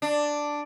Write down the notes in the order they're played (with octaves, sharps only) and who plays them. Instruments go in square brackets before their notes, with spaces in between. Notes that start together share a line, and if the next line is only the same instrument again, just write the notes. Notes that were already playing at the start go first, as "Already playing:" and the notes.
[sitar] D4